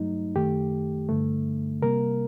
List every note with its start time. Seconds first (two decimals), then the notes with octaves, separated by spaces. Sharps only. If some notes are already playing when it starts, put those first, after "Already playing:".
Already playing: G2 F#3 A3 D#4
0.35 F#2 D#3 A3 G4
1.09 G2 D3 A3
1.82 C3 G3 A#3 A#4